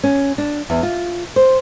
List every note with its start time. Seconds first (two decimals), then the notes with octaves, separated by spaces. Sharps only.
0.04 C#4
0.38 D4
0.70 E2
0.83 F4
1.36 C5